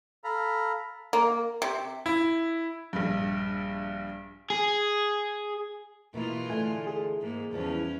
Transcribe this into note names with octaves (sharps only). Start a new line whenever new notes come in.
A4 F5 A#5 B5
A#3
C3
E4
A#1 G2
G#4
B2 E3 G#3 A#3 E4 F4
D3 A3 G#5
G#4
G#2 A#3
E2 E3 F3 G3 C#4